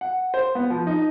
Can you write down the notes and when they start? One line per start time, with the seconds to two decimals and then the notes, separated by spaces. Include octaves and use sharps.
0.01 F#5
0.34 C5
0.55 B3
0.70 F3
0.87 D#4